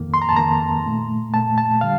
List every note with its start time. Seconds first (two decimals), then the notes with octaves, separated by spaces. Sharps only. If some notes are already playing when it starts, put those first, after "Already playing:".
Already playing: F2 D#3 A#3
0.14 C6
0.22 A#5
0.29 A5
0.37 F2 D#3 A#3 A#5
0.86 A#2 A3
1.34 A#2 A3 A5
1.58 A5
1.81 D3 G3 F5